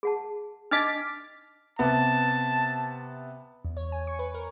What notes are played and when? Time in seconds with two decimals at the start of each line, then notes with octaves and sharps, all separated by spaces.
0.03 G#4 F#5 A5
0.71 D4 D#4 D#5 D6 F6 A6 B6 D7
1.79 C3 B3 A5
3.65 E2
3.77 C#5
3.92 G#5
4.07 C#6
4.19 B4
4.34 A#4